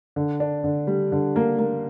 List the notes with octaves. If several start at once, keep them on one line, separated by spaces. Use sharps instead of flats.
D3
D4
D3
G3
D3
A#3
A#3